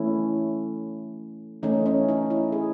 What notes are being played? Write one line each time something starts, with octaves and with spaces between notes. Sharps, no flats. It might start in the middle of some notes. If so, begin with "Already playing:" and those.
Already playing: E3 A3 C#4 E4
E3 A3 C#4 D#4
C#4
D#4
E4
G#4